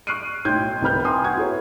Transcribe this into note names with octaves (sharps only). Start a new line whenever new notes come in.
C#6 F6 F#6 C7 D7 D#7
B1 A2 G5 C6 G6 G#6
C2 C4 B4 B5 F6 G6
G5 G#5 A#5 C6 D#6
F#4 F#5 C#6 G#6
E4 G#4 A4 B4 C#5